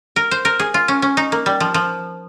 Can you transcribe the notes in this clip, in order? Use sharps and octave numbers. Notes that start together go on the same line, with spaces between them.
A#4
C5
A#4
G#4
F4
C#4
C#4
D#4
A#3
G3
F3
F3